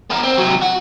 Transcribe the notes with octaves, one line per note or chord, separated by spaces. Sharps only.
B3 A#4
C4
C3 F#3
F#4